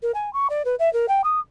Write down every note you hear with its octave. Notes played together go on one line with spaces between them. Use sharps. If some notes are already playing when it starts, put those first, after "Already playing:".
A#4
G#5
C#6
D5
B4
E5
A#4
G5
D#6